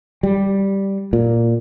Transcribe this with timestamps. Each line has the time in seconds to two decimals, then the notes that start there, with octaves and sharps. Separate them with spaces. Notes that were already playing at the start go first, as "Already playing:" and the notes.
0.23 G3
1.13 A#2